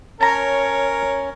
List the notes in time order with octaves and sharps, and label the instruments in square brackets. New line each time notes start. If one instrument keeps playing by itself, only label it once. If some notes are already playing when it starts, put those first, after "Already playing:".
[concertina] C#4 [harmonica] A#4 [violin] C#5 [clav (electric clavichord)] A5 A#5